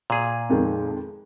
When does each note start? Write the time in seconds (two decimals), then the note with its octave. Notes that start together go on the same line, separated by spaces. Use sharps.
0.10 A#2 G#4
0.50 F2 D#3 G#3